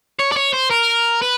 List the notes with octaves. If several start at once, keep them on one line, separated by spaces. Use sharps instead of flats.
C#5
D5
C#5
C5
A#4
B4